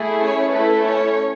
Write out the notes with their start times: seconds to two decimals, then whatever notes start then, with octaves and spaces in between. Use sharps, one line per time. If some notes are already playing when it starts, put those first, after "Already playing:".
Already playing: A3 E4 G#4
0.21 C#4 C#5
0.52 A3 E4 A4 B4
0.84 C#4 C#5